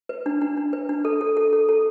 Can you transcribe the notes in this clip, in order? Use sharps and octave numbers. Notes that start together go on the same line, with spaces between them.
B4
D4
D4
D4
B4
D4
A4
A4
A4
A4
A4